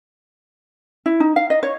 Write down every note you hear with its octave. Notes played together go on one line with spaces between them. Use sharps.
E4
D#4
F5
D#5
C#5